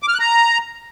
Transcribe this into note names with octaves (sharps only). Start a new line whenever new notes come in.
D6
F6
F#6
A#5